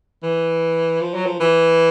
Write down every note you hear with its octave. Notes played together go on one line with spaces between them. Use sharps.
E3
F3
F#3
F3
E3